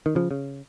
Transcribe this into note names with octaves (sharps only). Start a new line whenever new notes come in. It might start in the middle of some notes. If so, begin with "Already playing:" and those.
D#3
C#3 F3
C#3